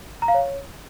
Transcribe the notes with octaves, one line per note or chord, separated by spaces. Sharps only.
A#5
F5
C#5